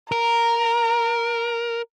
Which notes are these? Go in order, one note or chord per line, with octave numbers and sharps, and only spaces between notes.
A#4 A#5